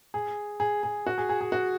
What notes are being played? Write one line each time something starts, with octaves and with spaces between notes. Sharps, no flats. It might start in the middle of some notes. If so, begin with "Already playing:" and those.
G#4
G#4
G#4
F#4
G#4
G#4
G#4
F#4